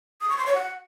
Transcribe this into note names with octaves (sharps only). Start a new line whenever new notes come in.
D#6
C#6
C6
C#5
F#5